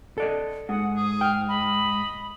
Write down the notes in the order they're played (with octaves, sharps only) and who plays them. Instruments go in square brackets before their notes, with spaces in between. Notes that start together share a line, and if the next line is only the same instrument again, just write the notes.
[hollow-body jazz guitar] A4 D5 D#5
[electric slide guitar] G#2 [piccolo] F#5 [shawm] D#6
[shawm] G#4 [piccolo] D#6
[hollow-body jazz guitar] G5 [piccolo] F6
[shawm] D#5 [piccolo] B5